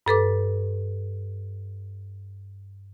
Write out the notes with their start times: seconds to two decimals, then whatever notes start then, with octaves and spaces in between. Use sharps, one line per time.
0.06 G2 A4 B4 D6